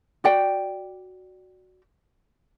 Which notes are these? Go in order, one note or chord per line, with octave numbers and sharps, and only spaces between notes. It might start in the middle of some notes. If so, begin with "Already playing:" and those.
F#4 D5 G5